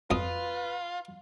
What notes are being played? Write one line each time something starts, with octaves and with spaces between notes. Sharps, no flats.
F2 F4 B4 D#6